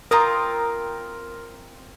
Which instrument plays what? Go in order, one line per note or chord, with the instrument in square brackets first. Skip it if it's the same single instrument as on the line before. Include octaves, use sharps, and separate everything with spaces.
[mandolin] C4 F4 D#6 [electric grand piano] A#4 A#5